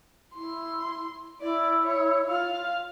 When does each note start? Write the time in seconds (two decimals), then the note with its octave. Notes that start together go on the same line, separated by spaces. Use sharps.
0.34 E4 C6
1.41 E4 D5
1.84 C#5
2.28 F4 F5